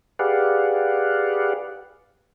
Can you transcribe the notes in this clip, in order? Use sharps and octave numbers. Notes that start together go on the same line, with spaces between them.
G4 G#4 B4 D5 F5 F#5